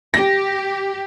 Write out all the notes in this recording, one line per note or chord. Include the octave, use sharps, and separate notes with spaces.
G4 A#6